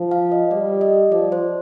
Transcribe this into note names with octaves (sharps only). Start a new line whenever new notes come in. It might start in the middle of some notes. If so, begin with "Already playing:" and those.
Already playing: F3
F5
D#5
G3 D5
D#5
F3 D5
C5